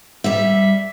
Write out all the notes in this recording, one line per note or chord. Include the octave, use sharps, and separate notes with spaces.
G3 E5